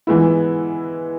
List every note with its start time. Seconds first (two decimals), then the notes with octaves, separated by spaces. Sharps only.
0.07 E3 G#3 B3 E4